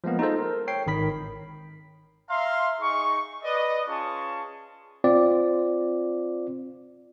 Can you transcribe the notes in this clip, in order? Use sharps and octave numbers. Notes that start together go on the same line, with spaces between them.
F3 G#3 A#3 B3
D#4 F4 G#4 A4 C5
A#4
C#5 G5 C7
G#1 D#3 B5 B6
E5 F5 A#5 C6
D#4 G#4 C#6
B4 D5 D#5
C#4 F4 G#4 A5 C#6
C4 F4 D5